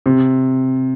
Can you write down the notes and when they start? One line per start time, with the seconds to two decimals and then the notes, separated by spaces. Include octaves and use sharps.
0.06 C3